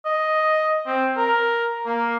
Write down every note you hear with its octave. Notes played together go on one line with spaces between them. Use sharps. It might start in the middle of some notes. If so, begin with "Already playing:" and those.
D#5
C4
A#4
A#3